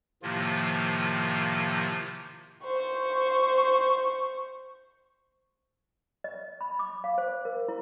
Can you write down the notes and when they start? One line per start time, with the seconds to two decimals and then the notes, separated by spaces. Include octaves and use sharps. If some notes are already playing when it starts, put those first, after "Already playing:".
0.23 A2 C3 D#3 F3 A#3 F4
2.64 C5 C#6
6.24 D#5
6.61 B5
6.79 D6
7.04 F5
7.18 C5
7.45 A#4
7.68 E4